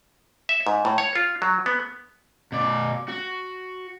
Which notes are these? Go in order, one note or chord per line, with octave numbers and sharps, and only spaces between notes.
E5
G#2
A2
C#5
F4
F#3
B3
B2 D5
F#4